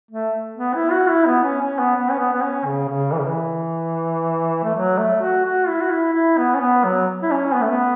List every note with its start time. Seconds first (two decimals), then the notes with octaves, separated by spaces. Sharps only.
0.11 A3
0.57 B3
0.75 E4
0.92 F#4
1.09 E4
1.26 B3
1.43 C#4
1.61 C#4
1.79 B3
1.96 B3
2.11 C#4
2.19 B3
2.33 B3
2.42 C#4
2.66 C#3
2.89 C#3
3.12 E3
3.19 C#3
3.26 E3
4.64 A3
4.75 F#3
4.98 A3
5.22 F#4
5.45 F#4
5.68 E4
5.81 F#4
5.91 E4
6.14 E4
6.38 B3
6.55 C#4
6.61 B3
6.84 F#3
7.23 E4
7.31 C#4
7.54 B3
7.61 A3
7.70 B3